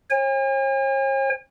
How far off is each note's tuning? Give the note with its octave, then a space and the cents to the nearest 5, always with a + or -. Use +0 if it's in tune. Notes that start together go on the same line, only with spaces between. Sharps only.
C#5 -45 G#5 -45